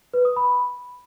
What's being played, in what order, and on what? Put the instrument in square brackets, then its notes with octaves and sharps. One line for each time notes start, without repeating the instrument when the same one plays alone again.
[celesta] B4
D#6
B5